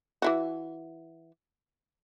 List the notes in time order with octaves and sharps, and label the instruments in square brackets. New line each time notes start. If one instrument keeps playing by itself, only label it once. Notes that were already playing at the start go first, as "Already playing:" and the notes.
[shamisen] E3 E4 F#4